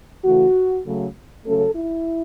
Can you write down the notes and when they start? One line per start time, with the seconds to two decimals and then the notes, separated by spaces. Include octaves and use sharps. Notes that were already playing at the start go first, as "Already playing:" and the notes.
0.23 C#3 E3 A3 F#4
0.84 C#3 F#3 A3
1.44 C#3 F#3 A3 C#4 A4
1.74 E4